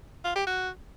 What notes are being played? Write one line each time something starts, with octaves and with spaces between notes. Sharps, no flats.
F4
G4
F#4